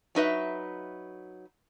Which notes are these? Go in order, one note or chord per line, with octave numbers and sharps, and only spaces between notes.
F#3 D#4 B4 E5